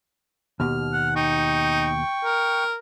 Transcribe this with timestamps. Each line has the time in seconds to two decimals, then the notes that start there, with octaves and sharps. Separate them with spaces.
0.60 D#2 B2 F6
0.93 F#5
1.16 D#4 G5 C#6
2.24 A#4